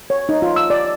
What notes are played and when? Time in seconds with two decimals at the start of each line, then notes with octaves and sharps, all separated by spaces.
0.10 C#5
0.29 D#4
0.42 F4
0.56 E6
0.70 D5